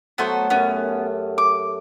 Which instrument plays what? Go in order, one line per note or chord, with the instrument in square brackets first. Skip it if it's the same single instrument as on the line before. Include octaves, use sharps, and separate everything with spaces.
[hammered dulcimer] F#3 A3 F#4 [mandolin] B3 A4 C5
[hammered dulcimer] F#2 G4 [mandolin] B3 C#4
[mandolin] D6